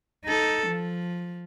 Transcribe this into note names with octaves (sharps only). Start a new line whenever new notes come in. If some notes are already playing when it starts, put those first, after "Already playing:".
D#4 A4
F3